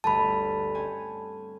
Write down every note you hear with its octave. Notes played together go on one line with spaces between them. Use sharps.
G1 D2 A5 B5
C4 C#4 G#5